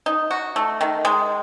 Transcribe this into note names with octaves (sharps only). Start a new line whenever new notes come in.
D#4
F#4
A3
D#3
G#3